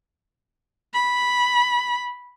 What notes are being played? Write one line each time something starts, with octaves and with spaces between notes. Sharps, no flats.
B5